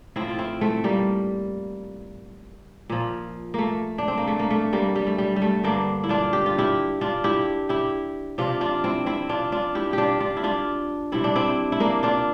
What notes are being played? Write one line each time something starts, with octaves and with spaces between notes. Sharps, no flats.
A2 F3 C4 E4
F4
C4 E4
A3 C4
G3 A#3
A#2 F3
A3 A#3
D4
C4
A#3
A3
A#3
A3
G3 A#3
G3
A3
G3
G3
A3
G2 D3 G3 A#3 D4
E4
D4 F4
G4
F4
E4 G4
D4 F4
E4 G4
E4 G4
C3 F3 D4 F4
D4 F4
C4 E4
C4 E4
D4 F4
D4 F4
E4 G4
G4
D4 F4
D4 F4
E4
D4 F4
C3 G3 E4
D4
C4 E4
E4
A#3 D4
D4 F4